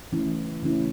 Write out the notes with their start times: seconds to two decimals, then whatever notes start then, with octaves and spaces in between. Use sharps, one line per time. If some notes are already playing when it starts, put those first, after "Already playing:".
0.12 C#3 E3 A3 C#4 E4
0.62 C#3 E3 A3 C#4 E4